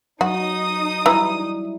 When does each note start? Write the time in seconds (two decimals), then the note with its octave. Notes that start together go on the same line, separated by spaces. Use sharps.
0.21 F#3 D#4 F#4 D#6
1.06 E3 G3 E4 A#5 E6